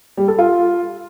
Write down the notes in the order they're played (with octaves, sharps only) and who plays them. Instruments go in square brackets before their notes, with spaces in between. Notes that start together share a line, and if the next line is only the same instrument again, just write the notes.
[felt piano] G3
A4
F4